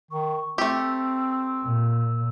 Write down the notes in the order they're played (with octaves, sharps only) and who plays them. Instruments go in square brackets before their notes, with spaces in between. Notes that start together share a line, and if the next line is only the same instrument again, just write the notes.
[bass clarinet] D#3 [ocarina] C#6
[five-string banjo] A3 G4 [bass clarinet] C4 [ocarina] E6
[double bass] A#2